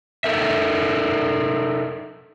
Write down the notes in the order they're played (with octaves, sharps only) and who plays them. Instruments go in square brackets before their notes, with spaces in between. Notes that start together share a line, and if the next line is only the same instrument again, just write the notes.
[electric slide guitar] D#4 A4 A#4 E5